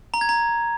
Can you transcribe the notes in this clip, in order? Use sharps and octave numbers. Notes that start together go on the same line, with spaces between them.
A#5
G#6
A#5